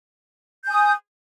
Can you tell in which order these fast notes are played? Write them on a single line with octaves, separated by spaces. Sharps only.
G6 G#5 D#6